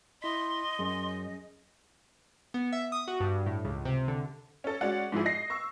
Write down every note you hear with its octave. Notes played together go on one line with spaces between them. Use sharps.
E4 D#5 C6 B6
F#2 C#4 G#4
B3
E5
D#6
F#4
G2
A2
C#2
C3
D3
C#4 A4
G#3 C#4 F#4 D5 F#5
G#2 F3 E4 G#4
D#5 A#6 C7
C#6 E6